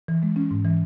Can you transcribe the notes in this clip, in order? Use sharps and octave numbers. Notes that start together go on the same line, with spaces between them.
E3
G#3
C#4
G#2
E3